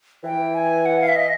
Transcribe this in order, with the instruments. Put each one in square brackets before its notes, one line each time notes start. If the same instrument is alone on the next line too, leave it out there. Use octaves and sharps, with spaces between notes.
[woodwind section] E3 [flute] G5
[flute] G#5
F#5
F5
E5
D#5